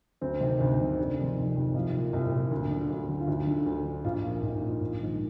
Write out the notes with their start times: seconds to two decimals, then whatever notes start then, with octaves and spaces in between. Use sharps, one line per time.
0.21 D2 C4
0.41 C3 D#3
0.60 D2
0.80 C3 D#3
0.98 F1 D4
1.17 F2 D#3
1.36 F1
1.55 F2 D#3
1.74 C2 F4
1.94 A#2
2.13 C2
2.32 A#2
2.51 D2
2.71 D3
2.90 D2
3.09 D3
3.20 F4
3.27 D2 D#4
3.47 D3
3.66 D2
3.86 D3
4.05 A#1 F4
4.23 A#2 F4
4.42 A#1 D#4
4.62 A#2
4.81 A#1
5.00 G#2 D#3